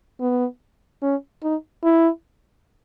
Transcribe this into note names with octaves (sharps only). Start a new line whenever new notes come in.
B3
C#4
D#4
E4